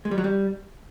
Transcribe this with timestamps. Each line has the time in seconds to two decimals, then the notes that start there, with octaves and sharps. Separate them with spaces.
0.05 G#3
0.11 G3
0.18 F#3
0.24 G3